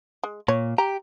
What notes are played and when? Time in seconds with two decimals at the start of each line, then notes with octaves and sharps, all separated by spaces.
0.24 G#3
0.48 A#2 C#5
0.78 G4 A#5